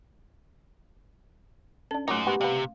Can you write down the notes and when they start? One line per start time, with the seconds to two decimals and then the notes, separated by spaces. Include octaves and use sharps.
1.91 C#4 D4 A4
2.08 A#2 F#3 G#3 A3 D#4 D6
2.26 B3 F#4 G4 A#4
2.41 C3 G3 B3 F5